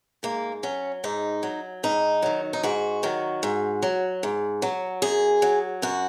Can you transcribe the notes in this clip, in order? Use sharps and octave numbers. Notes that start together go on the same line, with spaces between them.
G#2 A#3
F#3 C#4
G#2 D#4
F#3
G#2 D#4
D#3 F#3
D#4
G#2 F#4
D#3 F#3
G#2
F#3
G#2
F#3
F#2 G#4
F#3
F#2 F#4